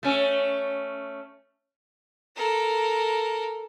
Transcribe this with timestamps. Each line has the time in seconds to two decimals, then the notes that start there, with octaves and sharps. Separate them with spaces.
0.03 A3 C#4
2.36 A4 A#4